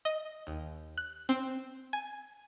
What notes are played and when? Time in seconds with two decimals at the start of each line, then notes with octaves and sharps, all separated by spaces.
0.05 D#5
0.47 D#2
0.97 F#6
1.29 C4
1.93 G#5